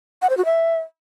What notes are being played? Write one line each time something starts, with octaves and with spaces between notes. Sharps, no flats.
F#5
C5
F#4
E5